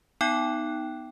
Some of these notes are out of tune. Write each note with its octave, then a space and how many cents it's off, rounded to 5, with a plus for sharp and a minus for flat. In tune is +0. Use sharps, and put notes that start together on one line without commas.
B3 +0 D#4 +0 G5 -15